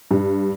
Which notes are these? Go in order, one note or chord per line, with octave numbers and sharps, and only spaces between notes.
G2